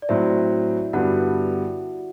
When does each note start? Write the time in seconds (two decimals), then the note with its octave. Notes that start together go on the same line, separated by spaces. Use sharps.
0.02 D5
0.09 A2 F#3 C4 E4 E5
0.93 G2 D3 G3 B3 F#4 F#5